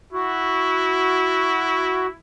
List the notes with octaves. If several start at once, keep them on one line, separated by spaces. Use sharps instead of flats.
E4 F#4